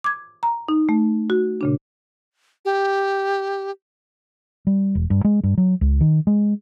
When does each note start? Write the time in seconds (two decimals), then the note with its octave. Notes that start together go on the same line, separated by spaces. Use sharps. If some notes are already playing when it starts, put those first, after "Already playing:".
0.04 D6 G#6
0.43 A#5
0.69 D#4
0.89 A3
1.30 F#4
1.61 A#2 C#3 D4
2.65 G4
4.67 G3
4.95 E1
5.10 G2
5.24 G#3
5.43 G2
5.58 F#3
5.81 C#2
6.01 D#3
6.27 G#3